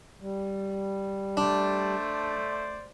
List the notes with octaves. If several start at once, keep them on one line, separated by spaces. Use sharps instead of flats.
G3
A3 D4 C5 D5